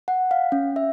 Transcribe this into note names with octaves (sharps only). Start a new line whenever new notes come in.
F#5
F5
C#4
E5